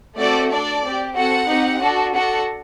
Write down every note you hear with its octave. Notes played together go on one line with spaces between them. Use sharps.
A3 C4 F#4 A4 D5
D4 A4 D5
C4 G4
C4 F#4 A4 F#5
C4 D#4 G4
D4 F#4 A4
D4 F#4 A4 F#5